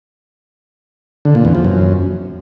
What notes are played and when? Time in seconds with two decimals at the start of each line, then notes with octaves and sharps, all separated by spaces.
1.25 D3
1.35 A#2
1.45 E2
1.55 F3
1.64 F#2